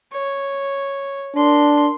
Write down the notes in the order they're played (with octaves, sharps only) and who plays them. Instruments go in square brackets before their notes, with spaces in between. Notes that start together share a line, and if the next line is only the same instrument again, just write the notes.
[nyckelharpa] C#5
[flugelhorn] D4 [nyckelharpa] A#4 C6